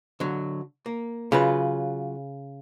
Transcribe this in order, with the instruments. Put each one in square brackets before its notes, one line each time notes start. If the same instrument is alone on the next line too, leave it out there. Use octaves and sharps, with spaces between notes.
[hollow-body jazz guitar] D3 F#3
A#3
[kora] C#3 [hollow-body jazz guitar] F#3 F4 B4